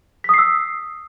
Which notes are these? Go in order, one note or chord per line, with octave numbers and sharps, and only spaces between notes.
D#6 E6 B6 C7